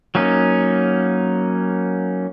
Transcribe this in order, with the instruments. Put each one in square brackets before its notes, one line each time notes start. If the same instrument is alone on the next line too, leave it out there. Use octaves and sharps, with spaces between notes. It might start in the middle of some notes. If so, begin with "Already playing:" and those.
[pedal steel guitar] F#3 A#3 C#4 D#4